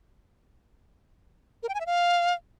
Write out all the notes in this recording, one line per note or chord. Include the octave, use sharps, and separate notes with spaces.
A#4
G5
G#5
E5
F5